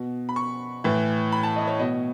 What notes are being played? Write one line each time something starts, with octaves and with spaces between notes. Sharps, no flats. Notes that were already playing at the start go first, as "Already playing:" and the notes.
Already playing: B2
B5
C#6
A2 E3
B5
A5
D#5
C#5
B2 D#5